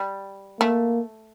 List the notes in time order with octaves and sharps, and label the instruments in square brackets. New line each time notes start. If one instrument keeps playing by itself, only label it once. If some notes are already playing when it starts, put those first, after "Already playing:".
Already playing: [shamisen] G3
[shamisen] A3 [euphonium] A#3